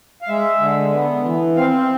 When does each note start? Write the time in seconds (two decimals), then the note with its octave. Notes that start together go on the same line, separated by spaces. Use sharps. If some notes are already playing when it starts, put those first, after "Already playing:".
0.22 F5
0.28 G#3 E5
0.60 D3
0.92 B3
1.24 E3
1.56 C4 F5